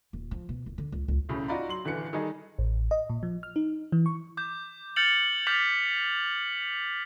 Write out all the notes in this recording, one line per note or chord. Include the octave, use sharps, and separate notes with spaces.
D#1
F3
B2
D1
D3
C#2
C#2
E1 A2 C#3
D#4 F4 F#4 D5 A#5 B5
F#3 C6 F#7
D#1 D3 E3 F#6 C#7
D#3 G3 D#4 G#4 A4
A1
D#5
A#2
F3
F6
D#4
E3
C#6
D6 G6
F6 G6 A6 C#7 F7 F#7
D6 F6 G6 A6 B6 F7